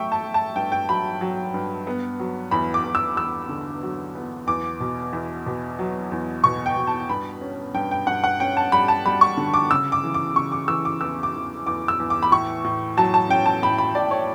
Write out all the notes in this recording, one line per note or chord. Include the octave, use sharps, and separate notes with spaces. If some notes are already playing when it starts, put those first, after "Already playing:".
Already playing: F#3 A3 E5 G5 C#6
A5
A3
A5
G2 G5
G5
F#3 B5
F#3
G2
B3
F#3
E2 B5
D6
E2
E6
E2 E6
D3
F#3
B3
E2 D6
B2
E2
B2
F#3
E2
B2 C#6
G5
B2
A5
G2 B5
C#4
G2 G5
G5
G2 F#5
F#5
C#4 G5
A5
G3 B5
A5
G3 B5
C#6
D3
D6
C#3 E6
D6
E3
D6
C#3 C#6
D6
E3 E6
D6
E2 E6
D6
E2
E2 D6
E6
E2
D6
B5
A2 C#6
A2
F#3 A5
A5
C#4 G5
A5
A2 B5
B5
A2 D5
C#5